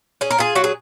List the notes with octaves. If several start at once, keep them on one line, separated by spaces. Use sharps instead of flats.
C#4 G#4
A#4
F4 G#4
F#3 F#4
G#4